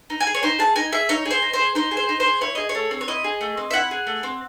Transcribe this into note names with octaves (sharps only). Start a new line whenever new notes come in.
D#4
G#5
G#4
C#5
D#4 C5
G#4 A5
D#4 G#5
G#4 E5
D#4 C#5
G#4
C5
D#4
C5
G#4
D#4 C5
G#4
C5
D#4
C5
G#4
E4 C#5
G#4 D#5
C#5
A3
C4
C#5
E4 D#5
G#4
A3
C4
E5
E4 F#5
G#4
A3
C4